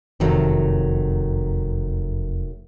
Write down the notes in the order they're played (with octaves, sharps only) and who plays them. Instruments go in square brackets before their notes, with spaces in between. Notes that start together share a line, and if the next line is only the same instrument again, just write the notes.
[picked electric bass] E1 F2 C3 [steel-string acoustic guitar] D#3 F#3 A3